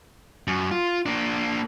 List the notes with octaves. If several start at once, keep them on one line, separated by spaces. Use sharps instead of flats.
F#2
F4
A#3 D4